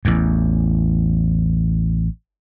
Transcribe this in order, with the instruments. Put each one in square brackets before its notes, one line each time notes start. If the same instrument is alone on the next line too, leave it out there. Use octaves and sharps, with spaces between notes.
[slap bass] A1 E2